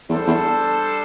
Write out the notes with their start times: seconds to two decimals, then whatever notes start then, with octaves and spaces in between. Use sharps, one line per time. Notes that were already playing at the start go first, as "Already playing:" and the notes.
0.09 E2 G3 D4 A4 C5
0.27 E2